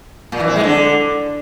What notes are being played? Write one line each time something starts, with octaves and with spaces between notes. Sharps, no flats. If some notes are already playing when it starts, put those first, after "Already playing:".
A#2
E3
C4
G#3
D3